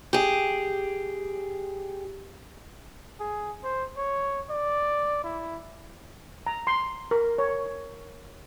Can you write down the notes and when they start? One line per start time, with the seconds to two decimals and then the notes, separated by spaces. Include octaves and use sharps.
0.13 G4 G#4
3.20 G#4
3.64 C5
3.97 C#5
4.50 D5
5.24 E4
6.47 A#5
6.67 C6
7.11 A#4
7.38 C#5